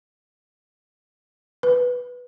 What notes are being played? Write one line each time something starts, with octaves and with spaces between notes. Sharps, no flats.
B4